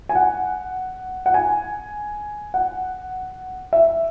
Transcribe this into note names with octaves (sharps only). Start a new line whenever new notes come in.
G#5
F#5
F#5
G#5
F#5
E5